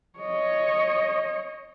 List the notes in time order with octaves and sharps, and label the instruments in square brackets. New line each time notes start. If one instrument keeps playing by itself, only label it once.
[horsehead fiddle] C#5 D#5